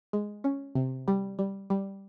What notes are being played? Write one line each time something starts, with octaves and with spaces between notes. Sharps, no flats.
G#3
C#4
C3
G3
G3
G3